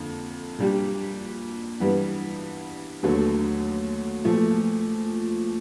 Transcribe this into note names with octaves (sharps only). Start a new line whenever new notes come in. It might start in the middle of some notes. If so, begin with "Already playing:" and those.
Already playing: F2 D3 A#3
A#2 G3 A#3 D4 G4
G2 E3 G3 B3
D#2 D3 F#3 A3
A#2 F3 A3